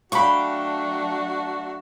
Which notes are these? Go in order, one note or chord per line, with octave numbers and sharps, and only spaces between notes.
F#3 A3 D4 F#4 F5 G5 B5 C#6